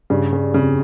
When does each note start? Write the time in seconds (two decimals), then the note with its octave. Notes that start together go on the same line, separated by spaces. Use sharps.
0.10 G2 C#3
0.33 C#3
0.54 F2 C#3